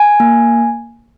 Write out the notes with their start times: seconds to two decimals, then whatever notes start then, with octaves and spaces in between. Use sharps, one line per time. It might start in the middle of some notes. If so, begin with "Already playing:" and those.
Already playing: G#5
0.20 A#3